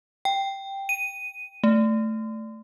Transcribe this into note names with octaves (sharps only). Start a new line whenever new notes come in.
G5
D#7
A3